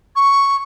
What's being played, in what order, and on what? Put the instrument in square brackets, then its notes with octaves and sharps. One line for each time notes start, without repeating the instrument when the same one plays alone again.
[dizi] C#6